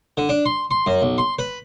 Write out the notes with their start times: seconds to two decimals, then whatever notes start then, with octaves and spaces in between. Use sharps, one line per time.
0.17 D3
0.29 D4
0.46 C6
0.71 C6
0.87 F#2
1.02 B1
1.18 C6
1.39 B4